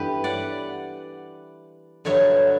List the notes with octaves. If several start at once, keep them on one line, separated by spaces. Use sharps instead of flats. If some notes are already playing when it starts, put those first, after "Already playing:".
Already playing: G2 E3 B3 E4 G4 A4 B4
D5 F#5
G2 D3 F#3 B3 D4 C#5 E5